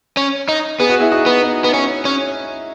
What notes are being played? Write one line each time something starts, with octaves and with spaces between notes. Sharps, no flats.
C#4
D#4
B3 G#4
F#4
E4 G#4
D#4 F#4
B3
D#4 F#4
B3
C#4
C#4